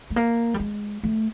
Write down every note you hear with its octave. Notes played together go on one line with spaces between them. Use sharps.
A3
A#3
G3
G#3
A3